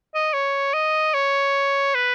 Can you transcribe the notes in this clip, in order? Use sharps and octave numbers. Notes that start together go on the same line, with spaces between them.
D#5
C#5
D#5
C#5
B4